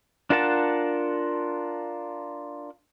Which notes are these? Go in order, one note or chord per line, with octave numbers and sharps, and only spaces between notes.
D4 F4 A#4 F#5 A5